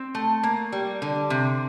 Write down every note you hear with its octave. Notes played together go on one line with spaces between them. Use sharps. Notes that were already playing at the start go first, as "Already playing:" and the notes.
Already playing: C4
A3
A#3
G3
D3
C3